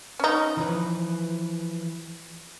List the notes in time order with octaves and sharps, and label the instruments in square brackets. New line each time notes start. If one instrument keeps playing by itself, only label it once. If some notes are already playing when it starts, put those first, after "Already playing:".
[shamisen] C#4 D#4
[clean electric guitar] E3 F3 B4